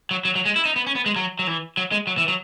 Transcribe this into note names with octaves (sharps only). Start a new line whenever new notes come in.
F#3
F#3
F#3
G#3
E4
D#4
B3
C#4
B3
G#3
F#3
F#3
E3
F#3
G#3
F#3
E3
F#3